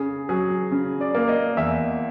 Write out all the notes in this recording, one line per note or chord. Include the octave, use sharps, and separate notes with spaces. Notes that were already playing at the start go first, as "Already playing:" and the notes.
Already playing: C#3 G#4
F#3 G#4
C#3
D5
A#3
D#5
E2 E5